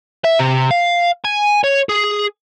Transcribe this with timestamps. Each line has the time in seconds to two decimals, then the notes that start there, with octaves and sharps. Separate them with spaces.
0.24 E5
0.39 C3
0.71 F5
1.25 G#5
1.64 C#5
1.89 G#4